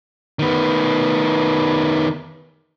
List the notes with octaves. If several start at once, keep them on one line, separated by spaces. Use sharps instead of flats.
D#3 B3